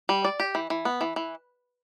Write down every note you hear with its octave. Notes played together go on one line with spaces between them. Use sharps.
G3
D5
G4
E3
E3
B3
E3
E3